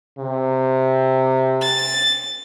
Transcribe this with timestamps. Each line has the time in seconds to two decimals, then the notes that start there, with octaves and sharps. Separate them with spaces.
0.18 C3
1.61 A6